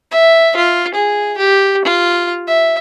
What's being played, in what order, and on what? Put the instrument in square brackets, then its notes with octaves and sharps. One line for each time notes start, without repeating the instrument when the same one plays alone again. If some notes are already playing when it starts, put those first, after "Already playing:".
[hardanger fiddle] E5
F4
G#4
G4
F4
E5